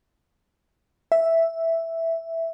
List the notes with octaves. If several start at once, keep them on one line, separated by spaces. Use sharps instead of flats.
E5